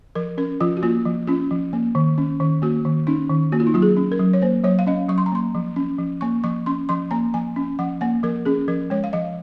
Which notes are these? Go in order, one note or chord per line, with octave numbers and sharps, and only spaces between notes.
F3 A#4
C#4 A#4
F3 F4
F#4
A#3 F4
F3
C#4 F4
F3
A#3
D#3
C#4
D#3
A#3 F#4
D#3
C#4 D#4
D#3
A#3 F#4
F4
D#4
F#3 F4
G#4
C#4
A#4
F#3
C#5
A#3 C5
F#3 C#5
F5
C#4 D#5
F#3 C#6
C6
A#5
A#3 C6
F3
C#4
F3
A#3 C#6
F3 C#6
C#4 C6
F3 C6
A#3 A#5
F3 G#5
C#4
F3 F#5
A#3 F#5
F3 A#4
C#4 G#4
F3 A#4
G#3 C#5
F5
F3 D#5